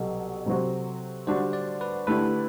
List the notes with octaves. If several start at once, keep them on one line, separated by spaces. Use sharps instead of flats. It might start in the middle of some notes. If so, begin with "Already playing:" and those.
Already playing: C2 B2 F#3 G4 A4
C3 F#3 C4 F#4
D3 G3 D4 F#4 C5
D5
B4
D3 A3 E4 G4 B4